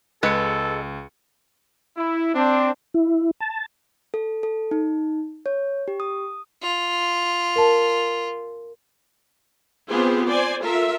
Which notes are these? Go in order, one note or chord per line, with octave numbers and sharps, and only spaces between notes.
C#2 G#3 A4 B4 C#7
E4
C4 D4
E4
A5
A4
A4
D#4
C#5
G4
D#6
F4
A#4 A5
B3 C4 F4 G4 G#4 C5
C5 D5 G#5
F4 A4 A#4 E5